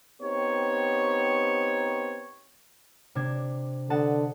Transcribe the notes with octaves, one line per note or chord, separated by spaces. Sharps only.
B3 C4 D#4 G4 C#5
C3 D4 G#6
D3 D#5 F#5 A5